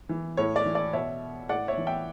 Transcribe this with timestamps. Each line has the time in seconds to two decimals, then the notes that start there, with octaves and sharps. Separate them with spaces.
0.09 E3
0.37 A2 C#5
0.56 D5
0.66 E3
0.75 D5
0.93 B2 C#5 E5
1.49 A2 D5 F#5
1.68 C#5 E5
1.77 E3
1.87 E5 G5